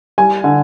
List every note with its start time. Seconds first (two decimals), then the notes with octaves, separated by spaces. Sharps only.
0.18 G3 G#5
0.44 D3